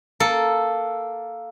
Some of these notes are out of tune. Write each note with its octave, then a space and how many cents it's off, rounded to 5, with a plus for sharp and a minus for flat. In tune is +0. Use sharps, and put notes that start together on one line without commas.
A#3 +0 A4 +0